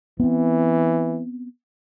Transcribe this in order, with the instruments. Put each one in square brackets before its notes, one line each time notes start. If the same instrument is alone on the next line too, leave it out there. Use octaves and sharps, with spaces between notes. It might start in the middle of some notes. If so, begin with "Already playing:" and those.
[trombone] E3 [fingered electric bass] B3 C4